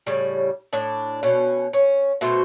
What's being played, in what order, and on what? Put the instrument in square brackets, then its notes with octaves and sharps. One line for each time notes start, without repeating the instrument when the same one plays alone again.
[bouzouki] A2 C#3 G3
A2 D4
B2 C#4
C#4
B2 A3 F#4 C5